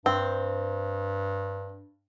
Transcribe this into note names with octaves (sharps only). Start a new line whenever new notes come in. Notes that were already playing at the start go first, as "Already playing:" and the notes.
G2 C4